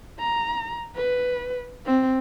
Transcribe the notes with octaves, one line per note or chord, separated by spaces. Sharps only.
A#5
B4
C4